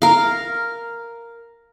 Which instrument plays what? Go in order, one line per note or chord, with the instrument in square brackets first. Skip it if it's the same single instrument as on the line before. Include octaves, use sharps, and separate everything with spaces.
[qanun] A#4 F5